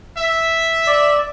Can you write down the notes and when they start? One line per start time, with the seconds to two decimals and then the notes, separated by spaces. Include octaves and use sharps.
0.18 E5
0.87 D5